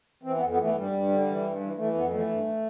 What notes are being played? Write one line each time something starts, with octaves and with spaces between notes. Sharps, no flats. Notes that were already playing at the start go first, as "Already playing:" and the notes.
E3 C4
B3
F2
B3
E3 A3
G2 G3
G2
D3
E3
G2
E3
E3 A3
F2 B3
E3 A3
G2